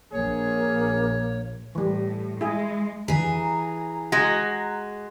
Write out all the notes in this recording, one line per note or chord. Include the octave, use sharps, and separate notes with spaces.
A#1 A#3 G#4 C#5
A2 E3 G3
G#3 E4 G#4
E3 G#4 A#5
G#3 F#4